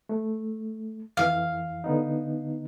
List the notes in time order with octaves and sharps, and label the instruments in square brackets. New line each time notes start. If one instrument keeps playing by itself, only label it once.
[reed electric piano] A3
[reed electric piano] F2 E3 [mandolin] F5
[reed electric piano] D3 B3 D#4